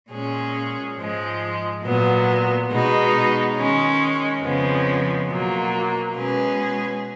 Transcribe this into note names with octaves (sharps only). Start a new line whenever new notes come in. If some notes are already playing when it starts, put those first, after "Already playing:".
A#2 G#3 C#4 G#4
G#2 F3 G#3
A#2 F#3 B3
B2 G#3 B3 D#4
D#3 G#3 C#4
F2 C#3 F3 G#3 B3
B2 F#3 A#3 F4
B2 G#3 C#4 G#4 B4